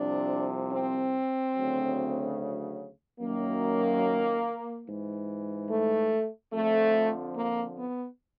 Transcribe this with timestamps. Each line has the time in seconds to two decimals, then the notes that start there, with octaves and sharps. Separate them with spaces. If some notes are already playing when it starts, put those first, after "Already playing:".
Already playing: C2 C3 F3 D4
0.72 C4
1.55 D2 C#3 F#3
3.20 F#2 D#3 F#3 A#3
4.86 G#2 E3
5.70 A3
6.52 F2 D3 F3 A3
7.35 A#3
7.77 B3